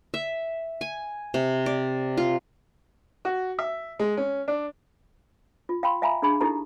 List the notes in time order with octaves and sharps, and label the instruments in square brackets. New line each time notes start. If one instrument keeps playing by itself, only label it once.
[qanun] E5
G#5
C3
D5
F4
[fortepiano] F#4
E5
G#3
C#4
D4
[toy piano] F4
F5 G5 B5 C6
E5 F5 G#5 A#5 B5
D4 G#4 B5
D#4 E4 G4 A4 A#5